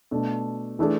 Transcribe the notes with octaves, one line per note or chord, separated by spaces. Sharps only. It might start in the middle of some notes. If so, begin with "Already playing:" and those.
B2 A3 D4
E3 A3 D4 G#4